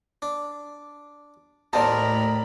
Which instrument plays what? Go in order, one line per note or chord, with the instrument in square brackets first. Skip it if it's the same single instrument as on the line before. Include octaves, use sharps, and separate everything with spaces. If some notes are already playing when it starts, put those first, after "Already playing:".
[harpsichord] D4
[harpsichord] D#2 C4 D#4 [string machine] A2 B5 [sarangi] A#4 [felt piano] D5 A5